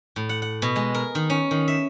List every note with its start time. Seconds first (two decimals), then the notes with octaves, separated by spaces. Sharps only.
0.16 A2
0.29 F#5
0.42 F#5
0.62 B2
0.76 G#3
0.94 A#4
1.15 D#3
1.30 C#4
1.51 D#3
1.68 E5